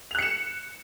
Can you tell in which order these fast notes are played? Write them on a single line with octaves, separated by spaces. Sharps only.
F7 F#6 C#7 E7